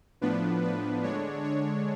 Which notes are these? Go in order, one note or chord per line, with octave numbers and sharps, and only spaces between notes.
A2 F3 B3 D4 B4
B4
D3 G#3 D4 C#5
C#5